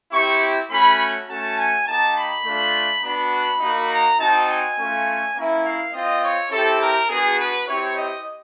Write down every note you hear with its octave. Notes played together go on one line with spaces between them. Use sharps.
C4 E4 G4 C#6
A3 C#4 F#4 B5
A3 C#4 F#4 A5
G#5
A#3 D#4 G4 A5
B5
A3 D4 F4
B3 D4 F#4 B5
A#3 D#4 F#4
A#5
C4 D#4 F#4 A5
G#5
A3 C#4 F4
A#3 C#4 E4
F5
C4 F4 D#5
C#5
C4 E4 G4 A4
A#4
B3 D4 F#4 G#4
B4
C4 E4 G4 C#5
D#5